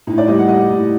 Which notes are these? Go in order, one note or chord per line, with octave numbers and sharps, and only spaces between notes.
A2 D#4
D5
G3 D#5
F#5
G3 D#5
A2